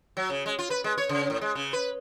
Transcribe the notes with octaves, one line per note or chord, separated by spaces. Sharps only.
F#3
C#3
G#3
F4
B4
G#3
C#5
C#3
A2
G#3
C#3
B4